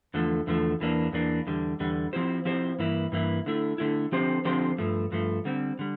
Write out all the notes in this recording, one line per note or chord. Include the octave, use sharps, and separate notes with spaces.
E2 D3 F3 A3
E2 D3 F3 A3
E2 E3 A#3 D4
E2 E3 A#3 D4
E2 D3 G3
E2 D3 G3
F3 C4 E4 G4 C5
F3 C4 E4 G4 C5
G2 E3 A#3 E4
G2 E3 A#3 E4
D3 A3 E4
D3 A3 E4
D3 F3 C4 G4 C5
D3 F3 C4 G4 C5
G2 F3 A3
G2 F3 A3
D3 G3 C4
D3 G3